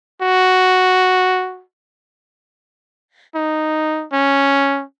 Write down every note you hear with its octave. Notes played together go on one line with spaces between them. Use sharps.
F#4
D#4
C#4